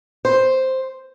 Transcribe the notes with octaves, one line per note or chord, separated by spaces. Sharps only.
C5